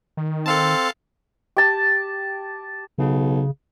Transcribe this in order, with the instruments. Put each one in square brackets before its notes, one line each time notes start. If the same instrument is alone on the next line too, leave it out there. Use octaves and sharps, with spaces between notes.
[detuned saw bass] D#3
[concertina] C4 [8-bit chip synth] A4 F5 A5
[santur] G4 A5
[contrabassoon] B1 [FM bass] C#3